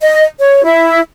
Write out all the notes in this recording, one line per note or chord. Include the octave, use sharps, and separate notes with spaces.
D#5
C#5
E4